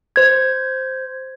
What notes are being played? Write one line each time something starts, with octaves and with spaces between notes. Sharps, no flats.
C5 G#6